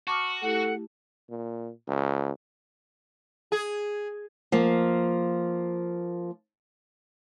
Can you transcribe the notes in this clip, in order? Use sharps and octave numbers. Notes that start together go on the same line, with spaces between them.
F#4 A5 C#6 D6 F6
A3 E4 G4 A4 F#5
A#2
C#2
G#4
F3 A#3